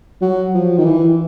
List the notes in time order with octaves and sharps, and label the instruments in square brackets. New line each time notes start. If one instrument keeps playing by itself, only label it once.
[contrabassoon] F#3
F3
D#3
E3